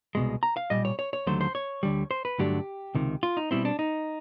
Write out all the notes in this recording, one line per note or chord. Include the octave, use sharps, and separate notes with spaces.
C2 B2 G#3
A#5
F5
B1 A#2 G3 D#5
C#5
C#5
C#5
D#2 D3 F#3 A3 C5
C5
C#5
D2 D3 G3
C5
B4
G2 D3 F#3 A3 D4 G4
C#2 C3 D#3
F4
D#4
B2 G3 C4 E4
D4
D#4